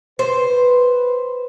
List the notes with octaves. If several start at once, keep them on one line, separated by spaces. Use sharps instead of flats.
B4 C5